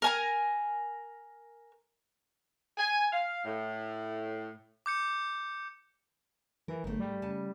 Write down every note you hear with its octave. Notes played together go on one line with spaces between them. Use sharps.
A#4 G#5 A#5
G#5
F5
A2
D6 G6 C#7
E3 A#4
G1 G#2 A3
G3
C#3 G#5 A5